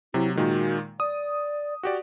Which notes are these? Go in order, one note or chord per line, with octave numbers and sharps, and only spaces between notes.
C3 F#3 E4
A#2 D#3 G#3 F#4
D5 D#6
F#4 G4 D5